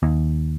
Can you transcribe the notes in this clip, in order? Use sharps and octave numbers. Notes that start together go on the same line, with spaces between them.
D#2